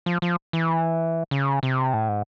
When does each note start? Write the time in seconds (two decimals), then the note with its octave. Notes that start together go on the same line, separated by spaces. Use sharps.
0.06 F3
0.22 F3
0.53 E3
1.31 C#3
1.63 C3
1.94 A2
2.09 G#2